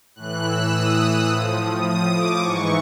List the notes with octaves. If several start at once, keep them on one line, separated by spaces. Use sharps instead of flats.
A2 E3 F#6
E6
D#6
A2 F3
D#6
D6
G#2 E3 C#6